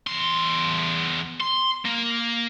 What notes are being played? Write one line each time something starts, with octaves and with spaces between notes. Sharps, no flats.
E2 C6
C6
A#3